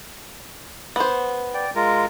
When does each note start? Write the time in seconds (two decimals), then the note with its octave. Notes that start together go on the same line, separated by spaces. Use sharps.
0.96 B3 C5
1.54 D5 G5
1.75 G#3 F4 A#4